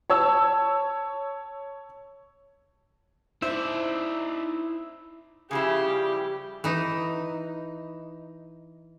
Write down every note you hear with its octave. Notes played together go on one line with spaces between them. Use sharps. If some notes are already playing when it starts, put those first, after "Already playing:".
C#5 A5 E6
D#4 E4 C5 D5 E5
C#3 F3 E4 G4 G#4
G3
E3 D#4